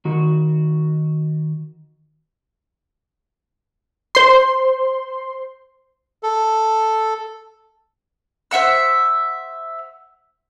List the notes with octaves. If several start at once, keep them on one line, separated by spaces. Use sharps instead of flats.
D#3 F#4
C5 C6
A4
C5 E5 F#5 E6